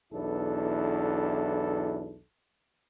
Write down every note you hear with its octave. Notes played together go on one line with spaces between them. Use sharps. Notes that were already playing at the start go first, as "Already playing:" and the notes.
B1 E2 D4 E4 A4